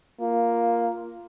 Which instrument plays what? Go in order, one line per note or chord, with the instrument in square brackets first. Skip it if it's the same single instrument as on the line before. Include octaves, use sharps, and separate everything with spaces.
[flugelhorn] A#3 [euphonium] F4